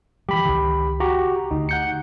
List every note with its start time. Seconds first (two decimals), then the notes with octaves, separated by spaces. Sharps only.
0.29 E3 G3 G4 B5
0.45 C#2 D#3
1.00 F#4 G4 A#5
1.51 D2 D#4
1.69 F#5 G6 C#7